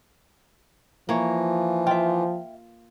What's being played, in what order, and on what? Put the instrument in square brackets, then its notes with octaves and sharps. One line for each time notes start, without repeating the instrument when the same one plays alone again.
[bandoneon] E3 [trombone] F3 [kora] A#3 C#5
[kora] F4 [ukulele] E5 G5